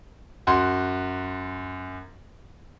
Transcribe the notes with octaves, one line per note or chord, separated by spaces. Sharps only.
F#2 F#4 C6